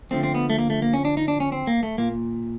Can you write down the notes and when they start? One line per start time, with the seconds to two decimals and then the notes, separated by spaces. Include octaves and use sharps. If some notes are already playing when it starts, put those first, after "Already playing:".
0.11 D3 F3 A3 C4
0.23 C4
0.35 B3
0.50 A3
0.59 A#3
0.70 A3
0.82 A#3
0.94 C#4
1.05 D4
1.17 D#4
1.28 D4
1.40 C#4
1.52 C4
1.67 A#3
1.83 A3
1.98 A#2 A#3